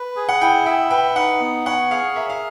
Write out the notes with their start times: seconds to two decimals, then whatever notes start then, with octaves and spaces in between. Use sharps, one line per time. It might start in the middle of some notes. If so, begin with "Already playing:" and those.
Already playing: B4
0.16 G#4
0.29 F#5
0.41 E4 G5
0.65 E5 G5
0.90 B4 G5
1.16 D#4 F#5
1.41 B3
1.66 C#5 F#5
1.91 G#4 F5
2.15 A#4 E5
2.30 F5